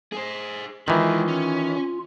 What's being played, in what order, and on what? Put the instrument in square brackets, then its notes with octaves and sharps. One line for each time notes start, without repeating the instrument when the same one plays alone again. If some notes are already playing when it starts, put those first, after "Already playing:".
[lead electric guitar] G#4 C5
[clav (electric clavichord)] D#3 E3 [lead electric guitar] G#3 E4 [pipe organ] F4
[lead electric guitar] C#4